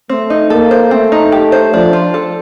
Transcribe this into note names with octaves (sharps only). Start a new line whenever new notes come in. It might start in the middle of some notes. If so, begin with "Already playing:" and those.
A3 C4
D#4
A#3 A4
C5
A3 C4
D#4
G4
C5
F3 D4
F4
A4